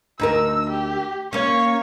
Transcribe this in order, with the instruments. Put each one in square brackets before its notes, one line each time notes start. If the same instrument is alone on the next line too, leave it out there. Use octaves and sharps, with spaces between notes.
[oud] D2 D#4 A#4 [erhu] E6
[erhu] G4
[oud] A#3 C#4 [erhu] C#5